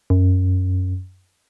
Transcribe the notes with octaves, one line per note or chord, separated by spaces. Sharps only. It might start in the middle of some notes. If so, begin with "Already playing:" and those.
F#2